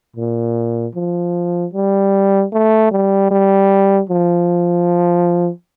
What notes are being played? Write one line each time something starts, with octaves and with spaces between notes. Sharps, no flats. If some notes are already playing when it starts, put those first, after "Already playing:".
A#2
F3
G3
A3
G3
G3
F3